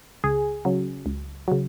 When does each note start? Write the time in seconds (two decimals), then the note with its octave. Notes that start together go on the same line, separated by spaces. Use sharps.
0.24 C#2 G#4
0.65 C#3 F#3
1.06 C#2
1.48 C#3 F#3